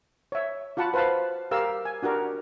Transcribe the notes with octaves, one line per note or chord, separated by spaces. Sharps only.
C#5 E5
F4 F#4 F#5 A5 B5
B4 C5 F5 A5 B5
G4 A#4 F5 E6
G#5
D4 F#4 G4 A#4